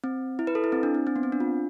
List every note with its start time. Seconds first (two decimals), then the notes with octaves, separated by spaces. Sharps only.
0.04 C4
0.39 E4
0.47 B4
0.55 A4
0.64 E4
0.72 C4
0.83 D4
0.95 C4
1.07 C4
1.16 B3
1.23 C4
1.32 D4
1.40 F4